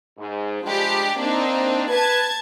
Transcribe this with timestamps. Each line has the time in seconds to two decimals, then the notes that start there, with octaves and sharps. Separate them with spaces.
0.18 G#2
0.62 F3 G3 G#3 D4 G4
1.16 A#3 C4 D4 D#4
1.89 B4 A5 G#6